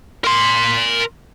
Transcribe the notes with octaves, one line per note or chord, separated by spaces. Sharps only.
A#4 C6